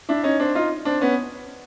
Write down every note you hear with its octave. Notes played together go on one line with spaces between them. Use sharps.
D4 E4
C#4 D#4
C4 D4
D#4 F4
C4 D4
B3 C#4